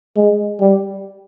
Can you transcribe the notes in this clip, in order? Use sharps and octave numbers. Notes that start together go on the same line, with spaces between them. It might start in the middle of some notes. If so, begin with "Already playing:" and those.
G#3
G3